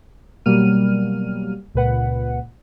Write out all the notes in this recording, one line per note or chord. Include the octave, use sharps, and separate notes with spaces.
B2 F#3 G3 A#3 F6 D#7
C#2 A#2 B4 F#5